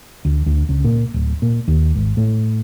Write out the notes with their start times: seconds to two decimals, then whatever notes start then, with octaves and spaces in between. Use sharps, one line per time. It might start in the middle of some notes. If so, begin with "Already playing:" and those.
0.25 D2
0.46 D2
0.69 C#2
0.85 A#2
1.14 D1
1.42 A#2
1.68 D#2
1.95 G#1
2.17 A2